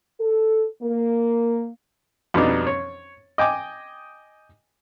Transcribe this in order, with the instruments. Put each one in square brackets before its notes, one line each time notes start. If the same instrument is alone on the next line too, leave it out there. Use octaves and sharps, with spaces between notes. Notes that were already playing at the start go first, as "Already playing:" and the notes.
[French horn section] A4
A#3
[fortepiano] F2 B2 G3 B3 D4 D#4
C#5
D#5 G5 G#5 D6